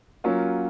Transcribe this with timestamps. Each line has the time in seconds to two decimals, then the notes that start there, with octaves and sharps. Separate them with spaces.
0.24 F#3 A#3 C#4 F4